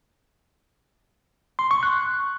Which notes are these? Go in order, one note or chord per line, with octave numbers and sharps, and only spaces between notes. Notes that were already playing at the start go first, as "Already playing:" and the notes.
C6
C#6
F#6